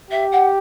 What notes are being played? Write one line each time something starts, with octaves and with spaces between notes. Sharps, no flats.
G4 E5
F#5